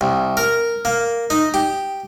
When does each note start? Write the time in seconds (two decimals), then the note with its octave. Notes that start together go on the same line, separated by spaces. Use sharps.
0.01 C2
0.37 A#4
0.85 A#3
1.30 D#4
1.54 G4